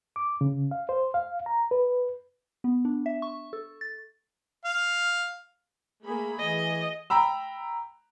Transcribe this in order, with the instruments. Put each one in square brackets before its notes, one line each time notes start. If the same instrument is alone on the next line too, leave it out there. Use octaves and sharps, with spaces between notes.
[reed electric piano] D6
C#3
F5
C5
F5
A#5
B4
[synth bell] B3
D4
E5
C#6
A4
A6
[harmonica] F5
[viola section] A3 A#3 B5 [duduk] G#4
[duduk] E3 [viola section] G#4 [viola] D#5
[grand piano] G5 A#5 B5 E6